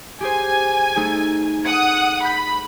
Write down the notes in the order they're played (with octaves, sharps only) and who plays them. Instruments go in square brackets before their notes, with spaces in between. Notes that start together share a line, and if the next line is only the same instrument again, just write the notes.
[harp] G4 G#4 C5 [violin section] G#5
[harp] A3 D#4 G#4
[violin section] F#5 D#6 [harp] G#6
[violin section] B5 [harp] G6